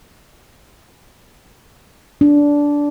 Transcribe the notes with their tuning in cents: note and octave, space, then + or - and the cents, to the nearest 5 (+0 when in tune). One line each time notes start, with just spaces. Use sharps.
D4 -15